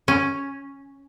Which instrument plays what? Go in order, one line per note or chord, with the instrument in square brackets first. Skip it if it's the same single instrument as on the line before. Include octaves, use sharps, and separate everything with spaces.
[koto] C#4